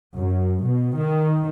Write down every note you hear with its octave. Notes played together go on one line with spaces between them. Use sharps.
F#2
B2
D#3